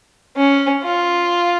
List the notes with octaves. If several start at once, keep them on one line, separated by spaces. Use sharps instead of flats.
C#4
F4